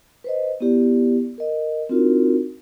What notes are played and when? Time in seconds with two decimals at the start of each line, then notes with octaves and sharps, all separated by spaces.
0.24 B4 C5 D#5
0.60 B3 E4 G4 D5
1.38 A#4 D#5
1.89 C4 D4 D#4 F4 F#4 A#4